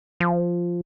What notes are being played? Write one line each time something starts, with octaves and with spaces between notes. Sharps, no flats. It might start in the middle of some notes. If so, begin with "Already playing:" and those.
F3